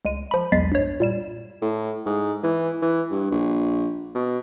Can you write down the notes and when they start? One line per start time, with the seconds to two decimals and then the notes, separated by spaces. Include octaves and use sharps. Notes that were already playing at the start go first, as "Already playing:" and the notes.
0.05 C#2 G#3 D#7
0.31 F3 B5
0.52 B1 E2 G#3 A6 B6 C7
0.72 G2 C#5
1.00 A#2 G3 E7
1.62 A2
2.06 G#2
2.43 E3
2.82 E3
3.11 G2
3.31 A#1
4.15 B2